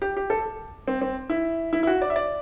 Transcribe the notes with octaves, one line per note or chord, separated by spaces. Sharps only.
G4
G4
A4
C4
C4
E4
E4
E4
F#4
D5
E5
D5